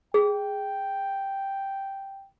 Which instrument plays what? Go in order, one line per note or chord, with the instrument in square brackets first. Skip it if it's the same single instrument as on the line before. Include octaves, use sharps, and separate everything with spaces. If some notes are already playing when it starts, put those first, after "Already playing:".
[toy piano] G#4 [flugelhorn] G5